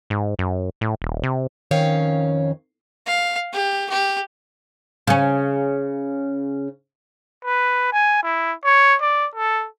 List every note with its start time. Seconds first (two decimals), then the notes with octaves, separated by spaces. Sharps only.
0.10 G#2
0.39 F#2
0.81 A2
1.02 D#1
1.23 C3
1.71 F2 D#3 C#4 C#5 F5
3.06 F5
3.53 G4
3.90 G4
5.07 C#3 C#4
7.45 B4
7.93 G#5
8.24 E4
8.64 C#5
9.01 D5
9.35 A4